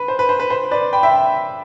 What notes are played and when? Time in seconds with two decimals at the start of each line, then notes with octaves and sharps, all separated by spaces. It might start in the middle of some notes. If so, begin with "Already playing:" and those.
Already playing: B4
0.08 C5
0.19 B4
0.29 C5
0.39 B4
0.50 C5
0.71 B4 D5
0.93 G5 B5
1.03 E5 G5